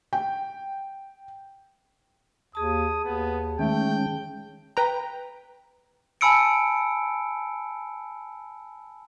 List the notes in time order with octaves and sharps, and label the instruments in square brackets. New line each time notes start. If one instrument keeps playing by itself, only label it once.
[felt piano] G5
[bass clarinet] D#2 [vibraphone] G#4 A5 [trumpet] D#6
[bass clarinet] D#2 [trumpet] B3
[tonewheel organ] D#3 G#3 C#4 [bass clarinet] A3 [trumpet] G5
[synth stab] B4 G5 A#5
[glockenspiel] G#5 A5 B5 E6 C#7 D7